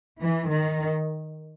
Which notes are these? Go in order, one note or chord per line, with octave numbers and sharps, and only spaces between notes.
E3
D#3